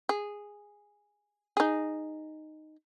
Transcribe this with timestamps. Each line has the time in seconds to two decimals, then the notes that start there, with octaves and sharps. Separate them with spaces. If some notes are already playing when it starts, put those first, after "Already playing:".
0.09 G#4
1.57 D#4 G#4